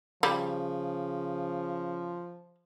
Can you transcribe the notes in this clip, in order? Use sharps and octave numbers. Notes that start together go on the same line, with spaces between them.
C#3 F3 G3